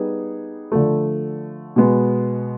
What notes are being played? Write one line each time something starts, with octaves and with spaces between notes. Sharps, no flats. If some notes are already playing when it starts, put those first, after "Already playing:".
Already playing: G3 B3 D#4 G#4
D3 F3 A3
B2 G#3 B3